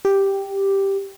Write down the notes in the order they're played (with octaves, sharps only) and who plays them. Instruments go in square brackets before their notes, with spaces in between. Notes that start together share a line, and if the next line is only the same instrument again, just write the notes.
[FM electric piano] G4